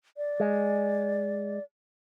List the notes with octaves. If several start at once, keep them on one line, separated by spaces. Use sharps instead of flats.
D5
G#3